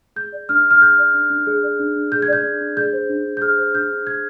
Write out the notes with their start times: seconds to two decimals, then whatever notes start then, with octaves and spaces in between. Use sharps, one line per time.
0.16 G#4 G6
0.32 D5
0.49 D4 F6
0.65 D4
0.71 F6
0.82 G#4 G6
0.98 D5
1.14 D4
1.30 D4
1.47 G#4
1.63 D5
1.79 D4
1.96 D4
2.12 G#4 G6
2.22 G#6
2.28 D5 G6
2.44 D4
2.61 D4
2.77 G#4 G6
2.93 C5
3.09 D4
3.26 D4
3.37 G6
3.42 G#4 F6
3.58 C5
3.74 D4 G6
3.91 D4
4.07 G#4 G#6